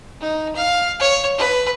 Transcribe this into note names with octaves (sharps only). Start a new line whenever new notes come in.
D#4
F5
C#5
B4